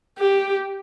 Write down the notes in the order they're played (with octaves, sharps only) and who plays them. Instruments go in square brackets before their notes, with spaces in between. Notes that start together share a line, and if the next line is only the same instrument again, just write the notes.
[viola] G4